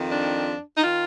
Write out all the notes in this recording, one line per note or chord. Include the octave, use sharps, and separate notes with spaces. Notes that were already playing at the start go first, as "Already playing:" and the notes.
Already playing: F2 D#3
D4
D#4
D#3 F4